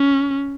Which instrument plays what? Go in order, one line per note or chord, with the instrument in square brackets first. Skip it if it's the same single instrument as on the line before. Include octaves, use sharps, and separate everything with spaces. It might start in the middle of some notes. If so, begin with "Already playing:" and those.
Already playing: [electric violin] C#4